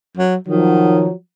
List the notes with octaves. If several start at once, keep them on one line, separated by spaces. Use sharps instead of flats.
F#3
D#3 F3 F#3